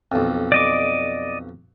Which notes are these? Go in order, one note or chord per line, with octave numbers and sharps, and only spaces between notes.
B1 F2
D5 D#5 D6